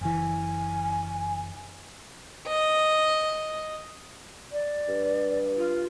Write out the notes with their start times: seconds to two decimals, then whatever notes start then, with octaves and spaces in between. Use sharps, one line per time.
0.01 F#1 E3 G#5
2.47 D#5
4.51 D5
4.88 G2
5.56 F4